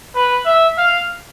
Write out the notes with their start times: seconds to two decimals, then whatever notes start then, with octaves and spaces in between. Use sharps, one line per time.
0.15 B4
0.46 E5
0.78 F5